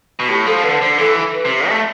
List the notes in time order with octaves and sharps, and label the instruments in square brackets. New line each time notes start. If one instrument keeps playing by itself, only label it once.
[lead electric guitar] B2
[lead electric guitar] A2 [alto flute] G4
[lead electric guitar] F3 [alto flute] A4
[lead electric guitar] D3 [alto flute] B4
[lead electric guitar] D3 [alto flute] C5
[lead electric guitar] E3 [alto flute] A4
[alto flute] B4
[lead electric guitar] C3
A3